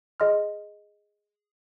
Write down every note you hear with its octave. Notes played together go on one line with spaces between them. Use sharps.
G#4 D#5 C6 F6